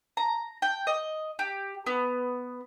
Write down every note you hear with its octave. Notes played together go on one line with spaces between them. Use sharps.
A#5
G5
D#5
G4
B3